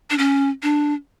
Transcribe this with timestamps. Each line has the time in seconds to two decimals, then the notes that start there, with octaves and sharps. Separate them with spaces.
0.10 D4
0.18 C#4
0.63 D4